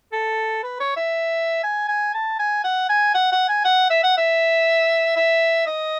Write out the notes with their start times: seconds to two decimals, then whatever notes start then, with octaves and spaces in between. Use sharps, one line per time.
0.13 A4
0.63 B4
0.80 C#5
0.97 E5
1.64 G#5
1.88 G#5
2.14 A5
2.39 G#5
2.64 F#5
2.89 G#5
3.15 F#5
3.32 F#5
3.49 G#5
3.65 F#5
3.90 E5
4.04 F#5
4.18 E5
5.16 E5
5.67 D#5